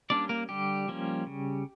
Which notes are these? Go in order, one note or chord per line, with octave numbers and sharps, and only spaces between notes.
G3 A#3 C#4 D4 D5
A#3 A#4
D3 G3 G4
F3 A#3 C#4
C#3